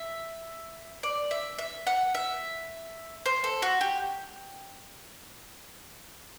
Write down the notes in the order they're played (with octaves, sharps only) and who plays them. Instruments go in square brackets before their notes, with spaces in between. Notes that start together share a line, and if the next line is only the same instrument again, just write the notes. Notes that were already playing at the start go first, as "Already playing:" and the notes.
Already playing: [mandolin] E5
D5
E5
E5
F#5
E5
C5
A4
F#4
G4